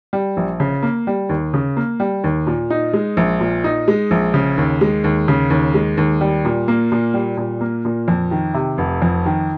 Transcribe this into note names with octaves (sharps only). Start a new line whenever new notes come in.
G3
A#1
C#3
A#3
G3
D#2
C#3
A#3
G3
D#2
A#2
D#4
G#3
A#1
A#2
D#4
G#3
A#1
C#3
D#2
G#3
D#2
C#3
D#2
G#3
D#2
G3
A#2
A#3
A#2
G3
A#2
A#3
A#2
F2
D#3
C3
F1
F2
D#3